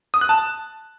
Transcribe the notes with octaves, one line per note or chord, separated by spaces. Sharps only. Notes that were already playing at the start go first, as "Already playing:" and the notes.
D#6
F#6
A5